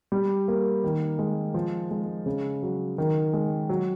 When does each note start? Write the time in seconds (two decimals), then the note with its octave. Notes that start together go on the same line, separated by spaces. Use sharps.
0.12 G3
0.48 A#3
0.84 D#3
1.19 G#3
1.54 F3
1.91 G#3
2.26 C#3
2.63 F#3
2.98 D#3
3.33 G#3
3.69 F#3